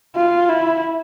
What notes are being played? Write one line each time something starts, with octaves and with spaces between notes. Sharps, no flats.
F4
E4